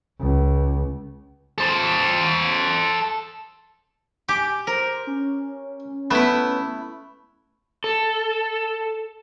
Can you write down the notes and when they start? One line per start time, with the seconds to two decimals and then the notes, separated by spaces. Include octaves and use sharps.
0.19 C#2
1.58 A4 C5
4.29 G4 G#5 D6
4.67 A#4 C5
5.07 C#4
6.11 A3 B3 E4
7.84 A4